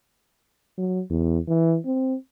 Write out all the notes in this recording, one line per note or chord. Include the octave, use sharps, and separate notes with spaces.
F#3
E2
E3
C4